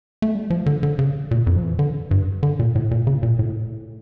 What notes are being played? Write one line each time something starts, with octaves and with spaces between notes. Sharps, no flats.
A3
G3
F3
D3
D3
C#3
A#2
F2
F3
E3
D3
G2
D3
A#2
A2
A#2
C#3
A#2
A2